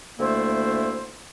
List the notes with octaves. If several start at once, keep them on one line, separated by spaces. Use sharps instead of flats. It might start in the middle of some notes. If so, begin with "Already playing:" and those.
D2 A3 A#3 E4 C5